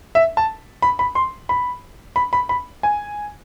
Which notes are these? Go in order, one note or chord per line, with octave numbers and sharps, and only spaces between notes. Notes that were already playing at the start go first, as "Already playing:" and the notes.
E5
A5
B5
B5
C6
B5
B5
B5
B5
G#5